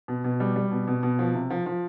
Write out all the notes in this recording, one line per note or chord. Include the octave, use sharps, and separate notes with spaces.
B2
B2
G3
G3
B2
B2
B2
F3
C3
F3
F3